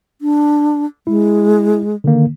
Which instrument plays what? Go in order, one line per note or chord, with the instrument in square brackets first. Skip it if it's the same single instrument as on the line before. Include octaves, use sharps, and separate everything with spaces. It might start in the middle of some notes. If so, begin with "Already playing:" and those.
[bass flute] D4
[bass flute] G#3 [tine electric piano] E4
[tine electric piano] D3 D#3 A#3